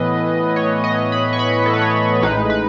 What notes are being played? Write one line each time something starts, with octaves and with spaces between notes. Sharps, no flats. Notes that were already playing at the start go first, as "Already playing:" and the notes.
Already playing: A2 E3 B3 B4 D#5
C#5
D#5
B5
C#6
B5
A4
B4
C#5
A1 A2 G#3 D#4 B4
B4